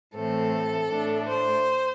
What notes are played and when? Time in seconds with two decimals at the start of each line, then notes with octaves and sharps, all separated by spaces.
0.15 A2 E3 A3 C4 A4
0.90 A2 A3 D4
1.28 C5